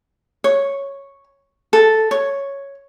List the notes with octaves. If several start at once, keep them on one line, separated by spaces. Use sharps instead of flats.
C#5
A4
C#5